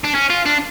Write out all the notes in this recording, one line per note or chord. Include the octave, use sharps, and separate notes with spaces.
D4
C#4
F4
D4